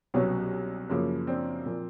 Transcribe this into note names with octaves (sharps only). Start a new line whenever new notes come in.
C2 B2 F#3 C#4
F#2 C#3 F3 A#3
C4 D4
A#2 F3 A#3